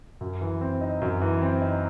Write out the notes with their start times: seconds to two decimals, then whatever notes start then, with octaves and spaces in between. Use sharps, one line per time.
0.21 F#2
0.41 E3
0.61 C4
0.81 D#4
1.02 F#2
1.22 E3
1.41 C4
1.62 D#4